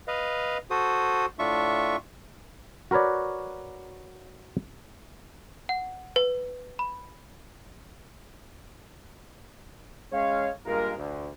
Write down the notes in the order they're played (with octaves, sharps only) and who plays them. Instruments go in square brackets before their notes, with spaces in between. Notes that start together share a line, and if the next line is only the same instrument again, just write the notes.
[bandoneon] B4 D#5 F5
F#4 A4 C5 D#6
A2 D4 F4 E5 C#6
[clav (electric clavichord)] F#4 A#4 B4 C#5 D5
[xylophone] F#5
B4
B5
[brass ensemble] G#3 C#4 C#5 F5
G2 G#3 A#3 F4 A#4
D2